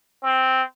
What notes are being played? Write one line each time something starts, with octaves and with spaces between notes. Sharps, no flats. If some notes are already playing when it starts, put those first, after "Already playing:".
C4